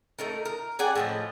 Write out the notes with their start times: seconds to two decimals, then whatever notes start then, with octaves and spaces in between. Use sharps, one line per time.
0.19 A3 D#4 A#4
0.45 A#4
0.79 G#4 D5 F#5 G#5
0.95 A2 F3 D#5